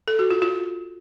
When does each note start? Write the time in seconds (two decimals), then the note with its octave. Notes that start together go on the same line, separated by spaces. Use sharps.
0.08 A4
0.19 F#4
0.31 F4
0.42 F4